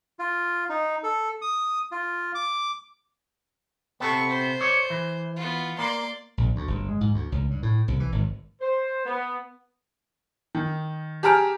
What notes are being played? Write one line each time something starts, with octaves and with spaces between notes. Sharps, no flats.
F4
D#4
A4
D#6
F4
D6
C3 B3 A4 C#6
C5
C#5 D5
E3
B3 F4
A#3 D5 C6
A#1
D2
G1
G#3
G#2
D2
C#2
G2
A2
C2
E3
G#1
C5
B3
D#3
G4 G#4 A5 A#5 F6 D7